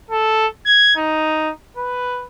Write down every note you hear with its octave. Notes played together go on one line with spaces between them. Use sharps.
A4
G#6
D#4
B4